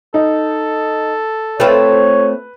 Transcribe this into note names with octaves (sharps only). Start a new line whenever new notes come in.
D#4 A4
A3 C4 F4 B4 C#5